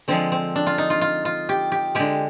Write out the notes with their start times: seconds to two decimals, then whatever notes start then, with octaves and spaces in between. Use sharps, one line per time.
0.08 D3 F3 G#3 C4
0.32 C4
0.55 D4
0.67 F4
0.78 D#4
0.90 F4
1.01 F4
1.25 F4
1.49 G4
1.72 G4
1.95 D3 G#3 G4